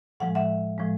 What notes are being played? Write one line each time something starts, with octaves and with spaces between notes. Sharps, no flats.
A2 F3 G#3 F#5
E5 F#5
A2 F3 G#3